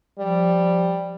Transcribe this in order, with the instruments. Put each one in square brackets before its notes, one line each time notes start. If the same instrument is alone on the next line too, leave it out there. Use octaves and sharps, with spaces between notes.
[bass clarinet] F3 [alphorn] G3